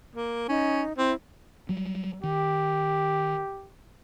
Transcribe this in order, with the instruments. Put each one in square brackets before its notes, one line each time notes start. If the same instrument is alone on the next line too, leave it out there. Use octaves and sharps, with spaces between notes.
[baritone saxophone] A#3
[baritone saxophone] C#4 [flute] D#4
[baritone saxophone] C4 [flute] E4
[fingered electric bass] F#3 G3
[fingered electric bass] D#3 [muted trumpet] G4